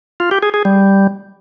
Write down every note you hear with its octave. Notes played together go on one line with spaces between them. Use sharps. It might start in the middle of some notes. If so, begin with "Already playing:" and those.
F4
G4
G#4
G#4
G3